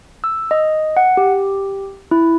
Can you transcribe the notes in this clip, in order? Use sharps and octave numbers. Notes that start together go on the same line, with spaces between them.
E6
D#5
F#5
G4
E4